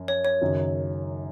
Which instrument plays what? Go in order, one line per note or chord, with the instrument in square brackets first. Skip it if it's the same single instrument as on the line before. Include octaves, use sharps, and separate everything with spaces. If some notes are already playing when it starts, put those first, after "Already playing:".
Already playing: [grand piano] F#2 F3
[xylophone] C#5
C#5
[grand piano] F#1 F#2 D#3 F#3